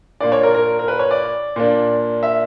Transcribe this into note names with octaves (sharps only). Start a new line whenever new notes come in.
A#2 A#3 D4 D5
C#5
A#4
A#4
A#4
B4
C#5
D5
A#2 A#3 D4
E5